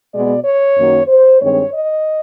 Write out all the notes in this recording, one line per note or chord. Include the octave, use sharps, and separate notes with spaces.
B2 G#3 B3 D5
C#5
F#2 D#3 F#3 A#3
C5
G2 D#3 G#3 C4 C#5
D#5